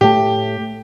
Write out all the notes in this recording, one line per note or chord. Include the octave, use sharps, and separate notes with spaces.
A2 A3 G4